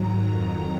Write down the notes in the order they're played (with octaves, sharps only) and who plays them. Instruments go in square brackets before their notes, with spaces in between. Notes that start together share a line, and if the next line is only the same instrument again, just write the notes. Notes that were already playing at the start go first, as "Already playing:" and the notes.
Already playing: [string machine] G#2 D#3 F#3 A#5
F2 D#3 F#3